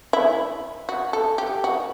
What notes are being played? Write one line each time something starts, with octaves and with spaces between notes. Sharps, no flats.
E4
F#4
A4
G4
F#4